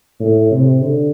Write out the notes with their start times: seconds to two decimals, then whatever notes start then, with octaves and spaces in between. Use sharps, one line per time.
0.21 A2
0.51 C3
0.82 D3